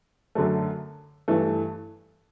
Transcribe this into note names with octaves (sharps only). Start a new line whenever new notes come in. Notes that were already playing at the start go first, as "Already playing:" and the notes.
F#2 D3 F#3 A3
G2 E3 A3